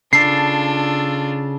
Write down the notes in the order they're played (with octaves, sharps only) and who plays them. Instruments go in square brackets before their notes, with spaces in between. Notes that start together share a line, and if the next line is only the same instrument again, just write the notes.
[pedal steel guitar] C#3 A4 A5 [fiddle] D4 F4 [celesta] C7